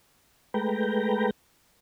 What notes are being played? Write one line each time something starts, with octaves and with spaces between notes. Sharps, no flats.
G#3 A3 B4 G5 A#5